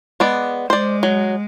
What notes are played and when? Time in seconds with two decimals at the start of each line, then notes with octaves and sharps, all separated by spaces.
0.20 G#3 B3 D5
0.70 G#3 C5 D5
1.03 F#3